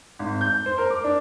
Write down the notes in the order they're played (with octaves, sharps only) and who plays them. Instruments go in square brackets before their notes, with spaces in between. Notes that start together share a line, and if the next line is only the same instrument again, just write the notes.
[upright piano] G#1
G6
C5
A#4
D6
D4